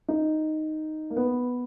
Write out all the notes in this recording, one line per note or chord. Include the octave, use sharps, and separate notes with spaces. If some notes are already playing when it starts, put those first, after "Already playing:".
D#4
A#3
B3